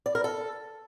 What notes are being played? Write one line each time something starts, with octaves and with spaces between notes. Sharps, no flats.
D5
A#4
A4